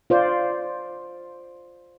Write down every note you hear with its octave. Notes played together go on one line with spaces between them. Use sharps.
F4 C5 D5